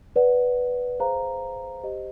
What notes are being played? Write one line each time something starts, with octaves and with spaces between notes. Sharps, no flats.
B4 D5 F#5
G#4 C5 F5 A#5
G4 C5 D#5